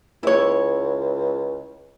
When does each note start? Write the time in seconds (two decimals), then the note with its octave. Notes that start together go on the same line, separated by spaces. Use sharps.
0.23 C#2 E4 C#5